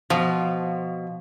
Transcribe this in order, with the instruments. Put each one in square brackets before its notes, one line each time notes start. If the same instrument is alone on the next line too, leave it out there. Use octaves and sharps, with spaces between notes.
[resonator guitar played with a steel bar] B2 [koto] F3